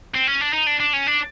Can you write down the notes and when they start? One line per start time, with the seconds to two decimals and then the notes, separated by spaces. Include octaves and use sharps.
0.14 C4
0.27 C#4
0.41 D4
0.53 D#4
0.67 D4
0.80 D4
0.93 C#4
1.07 D4